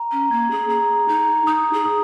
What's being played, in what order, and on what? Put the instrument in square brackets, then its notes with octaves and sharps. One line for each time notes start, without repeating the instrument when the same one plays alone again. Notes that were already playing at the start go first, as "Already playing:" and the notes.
Already playing: [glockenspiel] A#5
[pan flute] C#4
[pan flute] A#3 [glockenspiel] G#6
[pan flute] G#4
[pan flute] G#4 [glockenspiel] A#5
[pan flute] D#4 [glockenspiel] A#5
[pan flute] D#4 [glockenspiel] D#6
[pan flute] G#4
[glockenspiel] D#6